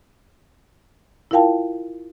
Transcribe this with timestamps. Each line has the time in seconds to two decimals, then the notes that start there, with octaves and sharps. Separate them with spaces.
1.31 E4 F4 A#4 F5 G5 A5